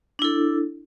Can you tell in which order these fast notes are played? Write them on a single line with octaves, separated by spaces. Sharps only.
D4 E4 A4